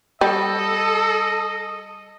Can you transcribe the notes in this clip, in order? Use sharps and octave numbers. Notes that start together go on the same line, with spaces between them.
G3 A4 D#5